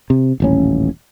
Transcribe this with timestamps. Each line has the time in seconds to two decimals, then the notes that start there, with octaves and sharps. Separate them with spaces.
0.10 C3
0.40 D#1 A1 C#4